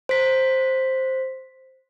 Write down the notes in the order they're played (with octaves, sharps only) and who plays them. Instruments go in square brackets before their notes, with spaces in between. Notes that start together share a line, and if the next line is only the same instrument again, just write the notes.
[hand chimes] C5 B6